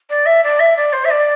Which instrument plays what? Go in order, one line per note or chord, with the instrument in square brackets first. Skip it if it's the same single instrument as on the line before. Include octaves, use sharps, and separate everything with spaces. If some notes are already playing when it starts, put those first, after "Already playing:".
[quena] D5
E5
D5
E5
D5
C5
E5
D5